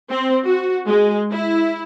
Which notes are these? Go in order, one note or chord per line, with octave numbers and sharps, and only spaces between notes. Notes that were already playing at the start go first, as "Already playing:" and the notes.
C4
F#4
G#3
E4